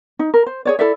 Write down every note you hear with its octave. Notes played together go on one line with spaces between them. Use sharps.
D#4
A#4
C5
G#4 C#5 D5
E4 A4 D5 E5